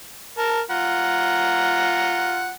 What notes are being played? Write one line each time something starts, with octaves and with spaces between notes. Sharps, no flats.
A#4 A5
F4 F#5 A#5